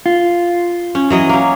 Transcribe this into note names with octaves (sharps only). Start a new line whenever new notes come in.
F4
C#4
E3 F#3 D#5
A#3 C#4